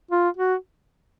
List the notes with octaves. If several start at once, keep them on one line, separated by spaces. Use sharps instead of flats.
F4
F#4